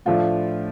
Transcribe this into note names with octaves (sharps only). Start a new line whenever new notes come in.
A2 F3 A3 D4 F4